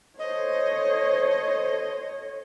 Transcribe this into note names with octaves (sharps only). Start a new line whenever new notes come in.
A4 C5 C#5 D#5